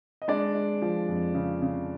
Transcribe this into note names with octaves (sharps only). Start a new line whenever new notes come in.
D#5
G#3 D4 D5
G#3
F3
F2
C#3
C#3